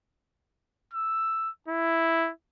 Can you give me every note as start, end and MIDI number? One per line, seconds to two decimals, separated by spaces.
0.93 1.50 88
1.68 2.31 64